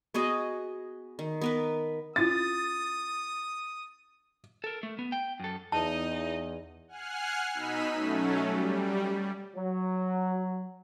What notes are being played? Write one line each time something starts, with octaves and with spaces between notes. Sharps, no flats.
B3 F#4 G#4 D#5
D#3
B3 A#4 B4
C#4 E4 F4 D#6 A6
A4 A#4
A3
B3
G5
F#2 A4
E2 D#4 D#5 A5
F#5 G#5 F6 F#6 C7
B2 D#4 B5 E6 B6 D#7
F#3 A3 C#4
G3
F#3